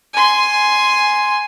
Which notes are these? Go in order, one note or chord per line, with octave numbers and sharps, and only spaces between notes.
G#5 C6